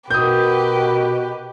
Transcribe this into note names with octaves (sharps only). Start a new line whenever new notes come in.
B2 D#4 F#4 G4 A#4 B4 D#6 G6